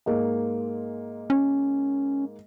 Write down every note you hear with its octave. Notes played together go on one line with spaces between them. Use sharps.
G#2 G#3 A#3
C#4